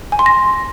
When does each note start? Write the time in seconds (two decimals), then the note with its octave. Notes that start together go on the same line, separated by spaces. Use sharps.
0.12 G#5
0.19 C6
0.26 A#6